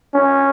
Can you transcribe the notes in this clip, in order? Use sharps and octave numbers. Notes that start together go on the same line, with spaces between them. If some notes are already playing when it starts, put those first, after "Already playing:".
C#4